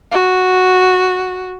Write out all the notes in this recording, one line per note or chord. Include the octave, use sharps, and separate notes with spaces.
F#4